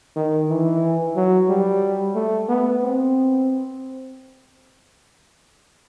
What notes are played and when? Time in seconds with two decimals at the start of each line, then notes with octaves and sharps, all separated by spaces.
0.16 D#3
0.49 E3
1.16 F#3
1.49 G3
2.15 A3
2.49 B3
2.82 C4